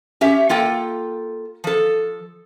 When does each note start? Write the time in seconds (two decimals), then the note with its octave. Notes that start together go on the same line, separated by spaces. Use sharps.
0.21 C#4 G4 E5
0.49 A#3 F4 A4 G5
1.64 F3 A4